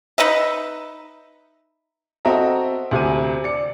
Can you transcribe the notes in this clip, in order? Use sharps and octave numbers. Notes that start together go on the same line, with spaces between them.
D#4 B4 D#5 E5
C4 F#4 A4 D#5 E5 A#5
D2 C3 G#5 D#7
D5 C#7